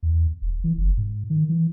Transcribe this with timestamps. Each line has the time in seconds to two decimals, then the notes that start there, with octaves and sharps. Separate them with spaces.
0.03 E2
0.42 D#1
0.64 E3
0.78 F#1
0.97 G#2
1.30 D#3
1.49 E3